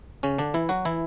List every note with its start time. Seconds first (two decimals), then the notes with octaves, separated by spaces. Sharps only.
0.23 C#3 C#4
0.38 D3 D4
0.54 E3 E4
0.69 F#3 F#4
0.85 E3 E4